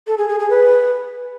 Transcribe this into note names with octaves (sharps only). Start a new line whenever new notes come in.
A4
G#4
G#4
G#4
B4